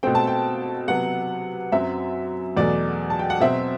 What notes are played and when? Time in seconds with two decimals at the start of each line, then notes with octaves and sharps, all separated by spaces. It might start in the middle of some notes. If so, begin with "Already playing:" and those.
0.03 B2 A3 C4 G5
0.15 A5
0.27 G5
0.88 C3 F#3 B3 F#5
1.72 F#2 F#3 C4 E5
2.57 E2 B2 F#3 A3 D5
3.10 A5
3.19 G5
3.30 F#5
3.40 B2 F#3 C4 E5